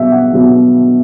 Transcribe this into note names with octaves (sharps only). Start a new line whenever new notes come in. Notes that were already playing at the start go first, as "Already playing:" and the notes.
Already playing: B2 F#3 B3 E5
F#5
B2 F#3 B3